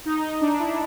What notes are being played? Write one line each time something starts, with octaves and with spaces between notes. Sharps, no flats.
D#4
D#4
D4
E4